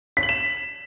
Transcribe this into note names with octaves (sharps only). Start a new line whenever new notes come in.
B6
F#7
E7